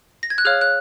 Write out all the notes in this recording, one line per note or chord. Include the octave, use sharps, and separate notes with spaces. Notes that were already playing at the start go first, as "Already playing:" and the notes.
A#6
G#6
F#6
G#4 C#5 F5 F6
F#6